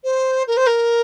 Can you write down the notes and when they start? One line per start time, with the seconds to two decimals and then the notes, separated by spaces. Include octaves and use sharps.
0.04 C5
0.47 A#4
0.57 C5
0.66 A#4